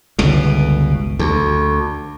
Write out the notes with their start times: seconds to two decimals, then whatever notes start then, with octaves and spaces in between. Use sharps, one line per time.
0.18 G1 C#2 B2
1.19 D2